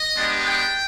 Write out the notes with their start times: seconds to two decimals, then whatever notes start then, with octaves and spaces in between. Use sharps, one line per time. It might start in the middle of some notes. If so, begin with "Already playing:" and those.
Already playing: D#5
0.15 G#3 B3 D4 G4
0.45 G5